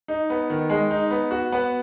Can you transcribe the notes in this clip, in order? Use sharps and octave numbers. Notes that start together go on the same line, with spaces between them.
D#4
B3
D#3
G#3
D#4
B3
F#4
B3